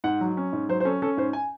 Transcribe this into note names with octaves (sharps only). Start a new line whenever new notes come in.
G#2 F#5
F#3
C#4
G#2
F#3 C5
C5
C#4 A4
C#4 A4
G#2 C5
G#5